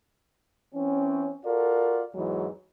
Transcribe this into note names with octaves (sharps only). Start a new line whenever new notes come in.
E3 C4 C#4
F4 F#4 A4 A#4 D5
E2 G#2 E3 F#3 G#3